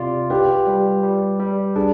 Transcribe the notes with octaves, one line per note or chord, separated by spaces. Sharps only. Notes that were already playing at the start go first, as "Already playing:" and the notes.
Already playing: C3 F4 D5
G4 B4
G3
G3
G3
D4 G#4